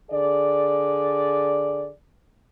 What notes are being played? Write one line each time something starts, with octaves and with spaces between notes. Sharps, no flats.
D3 G#4 D5